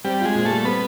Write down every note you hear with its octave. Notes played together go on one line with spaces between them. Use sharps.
G3 C4
G#3 F4
A#2
A3
G3
B3 C4